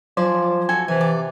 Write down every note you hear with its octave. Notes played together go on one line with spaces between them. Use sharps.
F3 F#3 C5 D5 G#5
F#4 A4 G#5
C3 E3 G#5
D5